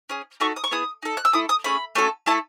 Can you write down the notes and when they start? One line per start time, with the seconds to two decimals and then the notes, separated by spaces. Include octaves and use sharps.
0.10 C#4 G#4
0.40 A3 D#4 F#4 A4 C#6
0.56 D#6
0.64 C#6
0.71 B3 E4 G#4 D#6
1.03 D#4 A4
1.17 F#6
1.25 E6
1.33 A3 E4 A4 D#6
1.49 D#6
1.64 A3 C#4 G#4 B5
1.95 A3 C#4 F#4 A4
2.26 A3 E4 A4 A5